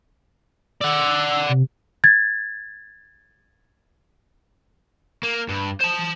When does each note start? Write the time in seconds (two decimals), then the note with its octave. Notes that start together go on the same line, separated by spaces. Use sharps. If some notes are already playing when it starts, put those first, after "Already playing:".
0.81 D5 F#5 E6
1.49 C3
2.04 G#6 A6
5.23 A#3
5.49 G2
5.81 C5 A5